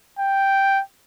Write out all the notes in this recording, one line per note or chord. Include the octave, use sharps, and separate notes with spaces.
G5